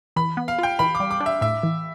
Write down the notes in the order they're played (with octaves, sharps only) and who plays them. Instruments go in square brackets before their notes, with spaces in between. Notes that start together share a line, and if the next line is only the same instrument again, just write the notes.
[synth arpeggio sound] E3 [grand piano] B5
[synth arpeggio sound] B3
[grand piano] F5
[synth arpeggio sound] F4 [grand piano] G5
[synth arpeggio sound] E3 [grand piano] B5
[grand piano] D6
[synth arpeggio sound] G3
[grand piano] D6
[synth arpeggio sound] D4
[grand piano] E5
[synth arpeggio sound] A2 [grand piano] E5
[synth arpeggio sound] E3